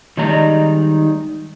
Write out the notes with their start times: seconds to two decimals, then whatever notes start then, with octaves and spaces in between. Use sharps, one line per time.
0.17 D#3 G3 G#3 D#4 D5 A#5